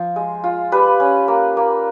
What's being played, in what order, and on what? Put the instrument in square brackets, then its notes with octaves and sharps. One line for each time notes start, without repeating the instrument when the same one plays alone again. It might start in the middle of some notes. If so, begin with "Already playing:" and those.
Already playing: [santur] F3 F4
G#3
F4
G3 B4
C#4
A#3
A#3